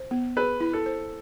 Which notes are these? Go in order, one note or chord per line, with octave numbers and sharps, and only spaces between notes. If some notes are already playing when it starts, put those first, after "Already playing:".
Already playing: C5
B3
G#4 B4
E4
A4
C5